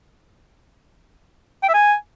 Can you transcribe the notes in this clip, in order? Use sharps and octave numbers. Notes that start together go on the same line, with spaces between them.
G5
E5
G#5